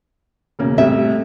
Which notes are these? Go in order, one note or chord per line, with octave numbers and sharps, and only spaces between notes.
E1 C#3 A#3
F2 A2 G3 E5